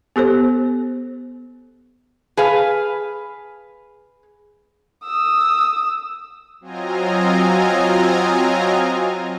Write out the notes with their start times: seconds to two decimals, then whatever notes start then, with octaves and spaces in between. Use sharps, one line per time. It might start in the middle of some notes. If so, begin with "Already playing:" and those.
0.16 B3 G4 A4 C5
2.37 G#4 B4 F5
5.04 D#6 E6
6.60 F#3 C4 F4 D#5 G#5 A#5